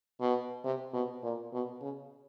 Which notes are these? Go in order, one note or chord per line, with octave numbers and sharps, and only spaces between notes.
B2
C3
B2
A#2
B2
C#3